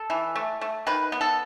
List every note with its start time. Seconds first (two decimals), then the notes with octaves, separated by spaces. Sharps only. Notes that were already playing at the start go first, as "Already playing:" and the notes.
Already playing: A4
0.10 E3
0.36 A3
0.61 A3
0.87 D#3 B4
1.12 B3
1.21 A4